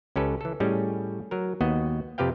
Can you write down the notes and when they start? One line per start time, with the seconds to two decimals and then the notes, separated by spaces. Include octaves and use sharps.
0.16 C#2 C#4 G4 A4 B4
0.41 E3 A4
0.60 A2 G3 C#4 G#4 D#5
1.31 F#3 A#4
1.61 D#2 B3 F#4 D#5
2.18 F2 C3 G4 B4 F5 G5